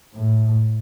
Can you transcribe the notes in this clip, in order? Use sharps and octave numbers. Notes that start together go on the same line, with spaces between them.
A2